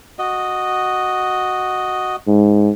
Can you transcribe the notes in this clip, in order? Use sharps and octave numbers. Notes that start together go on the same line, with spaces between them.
F#4 D#5
G#2